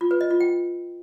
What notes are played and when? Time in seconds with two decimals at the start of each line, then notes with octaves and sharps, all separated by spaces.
0.01 F4
0.11 B4
0.21 D#5
0.31 F4
0.40 G5